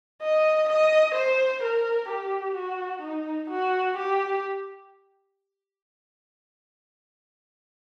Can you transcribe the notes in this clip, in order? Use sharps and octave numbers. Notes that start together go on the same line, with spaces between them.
D#5
D#5
C5
A#4
G4
F#4
D#4
F#4
G4